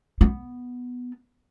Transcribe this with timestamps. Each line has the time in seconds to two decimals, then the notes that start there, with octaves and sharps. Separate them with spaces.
0.21 B3